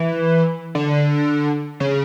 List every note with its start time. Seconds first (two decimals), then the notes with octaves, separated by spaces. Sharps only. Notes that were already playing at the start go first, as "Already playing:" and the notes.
Already playing: E3
0.75 D3
1.80 C#3